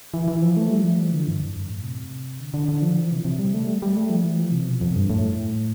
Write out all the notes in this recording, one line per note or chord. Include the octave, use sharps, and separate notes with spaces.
E3
E3
F3
A3
G3
F3
E3
D3
G2
F2
G2
A2
C3
D3
D3
D3
F3
E3
C3
C3
G3
A3
G3
G3
A3
F3
E3
F3
C3
B2
F2
G2
A2